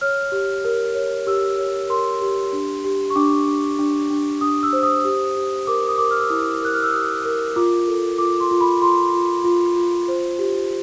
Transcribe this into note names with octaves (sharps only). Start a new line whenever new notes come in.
C#5 F6
G4
A#4
C#5
G4 E6
C#5
A#4 C6
G4
D4
G4
C#6
D4 D6
D4
D4
D4
D4 D#6
E6
C5
D#6
G4
G4
A#4 D6
D#6
A#4 D6
F6
E6
E4 D#6
A#4 F#6
F6
E6
G4 D#6
A#4
F4 D6
A4
F4 D6
C6
F4
B5
F4 C6
F4
F4
F4
C5
G4